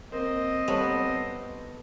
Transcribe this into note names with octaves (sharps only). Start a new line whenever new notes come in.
A#3 C4 D#5
G3 B3 A4 C#5